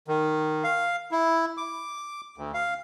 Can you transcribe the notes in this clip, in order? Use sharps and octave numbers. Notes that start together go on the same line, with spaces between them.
D#3
F5
E4
D6
D2
F5